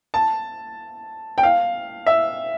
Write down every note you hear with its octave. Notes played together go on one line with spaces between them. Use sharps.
A5
G5
F5
E5